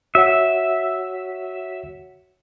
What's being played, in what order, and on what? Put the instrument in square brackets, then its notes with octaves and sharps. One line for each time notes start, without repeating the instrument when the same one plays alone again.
[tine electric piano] F#4 C#5 F#5 [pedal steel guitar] E5